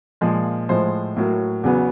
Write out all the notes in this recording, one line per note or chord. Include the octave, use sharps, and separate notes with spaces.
A#2 F3 G#3
A2 F3 G#3 C5
A2 F#3 A#3
E2 C#3 F#3 B3